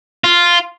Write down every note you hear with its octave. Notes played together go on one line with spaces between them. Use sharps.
F4